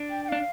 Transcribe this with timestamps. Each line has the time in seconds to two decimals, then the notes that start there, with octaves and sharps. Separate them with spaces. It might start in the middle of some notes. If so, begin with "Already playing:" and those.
Already playing: D4
0.10 G5
0.24 G5
0.29 D4 F5